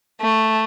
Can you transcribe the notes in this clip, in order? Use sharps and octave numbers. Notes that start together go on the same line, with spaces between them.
A3